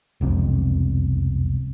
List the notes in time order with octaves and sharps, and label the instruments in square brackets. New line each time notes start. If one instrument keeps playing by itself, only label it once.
[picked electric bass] E1 C2 F2 C3